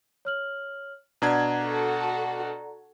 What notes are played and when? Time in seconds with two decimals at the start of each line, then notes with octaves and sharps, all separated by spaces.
0.25 C#5 F6 F#7
1.22 B2 D4 D5 F#5 A#5 G#6
1.63 F#4 A4